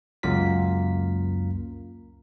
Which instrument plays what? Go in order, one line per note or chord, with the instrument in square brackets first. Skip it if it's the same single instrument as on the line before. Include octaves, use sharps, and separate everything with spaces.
[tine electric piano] C#2 F#2 A#3 F4 A#4 B6